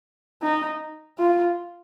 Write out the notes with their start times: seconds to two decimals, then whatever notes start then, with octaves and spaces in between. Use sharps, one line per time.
0.42 D#4
1.18 F4